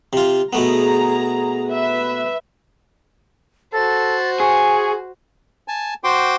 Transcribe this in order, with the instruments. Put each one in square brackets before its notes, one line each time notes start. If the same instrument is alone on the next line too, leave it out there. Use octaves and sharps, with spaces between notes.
[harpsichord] C3 F4
[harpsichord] B2 A3 B3 [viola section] G#4 A#5
[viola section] B4 E5
[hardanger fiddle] F#4 C5 [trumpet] A4 [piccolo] A6
[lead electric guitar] G#4 [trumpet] G#5 [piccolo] C#6
[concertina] G#5 A5
F#4 C5 G5 C6 D6